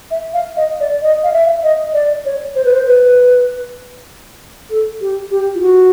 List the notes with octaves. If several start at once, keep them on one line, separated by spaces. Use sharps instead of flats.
E5
F5
D#5
D5
D#5
F5
E5
D#5
D5
C#5
C5
B4
C5
B4
A4
G4
G4
F4
F#4